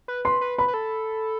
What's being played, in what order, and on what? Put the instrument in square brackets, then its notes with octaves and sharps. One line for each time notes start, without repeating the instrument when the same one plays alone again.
[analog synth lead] B4
[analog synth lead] B4 [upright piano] C6
[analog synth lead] B4
[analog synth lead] B4 [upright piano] B5
[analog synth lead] B4
A4